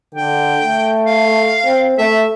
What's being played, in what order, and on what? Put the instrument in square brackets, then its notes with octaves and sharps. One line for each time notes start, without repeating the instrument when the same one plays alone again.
[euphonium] D3 [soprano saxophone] G5
[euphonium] A3
[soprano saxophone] F5
[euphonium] C4
[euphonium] A3 [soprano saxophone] E5